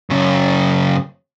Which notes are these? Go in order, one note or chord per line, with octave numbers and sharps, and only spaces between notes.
F#2 C#3